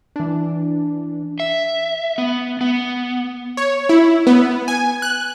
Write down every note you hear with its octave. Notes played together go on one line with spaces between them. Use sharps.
E3 D4
E5
B3
B3
C#5
E4
B3
G#5
F#6